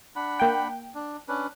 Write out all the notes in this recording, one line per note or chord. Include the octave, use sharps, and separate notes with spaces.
D4 F#5 B5
A#3 G5
D4
C#4 D4 B4